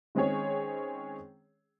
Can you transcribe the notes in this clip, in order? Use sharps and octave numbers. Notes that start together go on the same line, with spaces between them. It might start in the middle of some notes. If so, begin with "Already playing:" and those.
D#3 G#3 C4 C#4 G#4 C#5